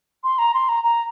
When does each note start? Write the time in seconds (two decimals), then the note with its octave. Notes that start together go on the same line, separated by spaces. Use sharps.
0.24 C6
0.39 A#5
0.54 C6
0.69 A#5
0.84 A#5